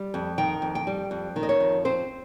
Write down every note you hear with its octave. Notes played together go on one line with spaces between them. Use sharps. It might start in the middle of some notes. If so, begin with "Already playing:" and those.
Already playing: G3
F2
D#3 G5
F2
G5
G3
F2
D#3
D#5
C#5
F2
C4 C5